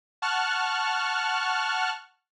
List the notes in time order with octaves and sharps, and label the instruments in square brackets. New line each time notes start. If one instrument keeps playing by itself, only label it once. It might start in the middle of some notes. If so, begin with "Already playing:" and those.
[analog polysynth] F#5 A5 C#6 F6 F#6